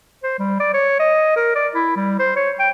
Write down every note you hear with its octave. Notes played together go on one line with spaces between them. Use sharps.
C5
G3
D5
C#5
D#5
A#4
D5
E4
G3
C5
C#5
G5